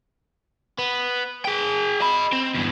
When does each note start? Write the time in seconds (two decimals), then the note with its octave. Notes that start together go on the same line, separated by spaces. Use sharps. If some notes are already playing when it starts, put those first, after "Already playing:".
0.78 B3
1.45 G#4 G5
2.00 D#5 B5
2.33 C4
2.55 E2 G2